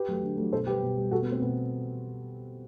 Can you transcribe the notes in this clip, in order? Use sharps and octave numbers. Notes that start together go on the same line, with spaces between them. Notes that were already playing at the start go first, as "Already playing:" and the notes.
Already playing: G4 B4
F#3 A3
D3
F#3 A3
B2 A4 C5
G3 G4 B4
B2
G3
B2 F#4 A4
B3
A3
C4
B2 B3